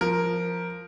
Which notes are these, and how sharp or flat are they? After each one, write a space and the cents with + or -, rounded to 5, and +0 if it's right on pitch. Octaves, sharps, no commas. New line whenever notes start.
F3 +0 A#4 +0